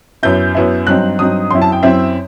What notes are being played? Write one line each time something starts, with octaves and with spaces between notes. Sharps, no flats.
F#2 F#3 B3 E4 G6
F#2 F#3 B3 E4
G2 F#3 C4 D#4 F#6
G2 F#3 C4 D#4 D#6
F#2 F#3 C4 E4 C6
A5
G5
F#2 F#3 C4 E4 E5